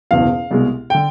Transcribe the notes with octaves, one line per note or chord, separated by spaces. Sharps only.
F#1 E2 B2 F5
C2 B2 G#3
D3 G5